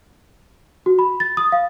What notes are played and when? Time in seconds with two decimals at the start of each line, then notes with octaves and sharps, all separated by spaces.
0.86 F#4
0.99 B5
1.20 A6
1.37 D#6
1.52 F5